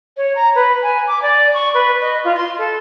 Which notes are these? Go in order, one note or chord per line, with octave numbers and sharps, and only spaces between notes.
C#5
A#5
B4
G#5
D6
D5
C#6
B4
D#5
F4
C6
A4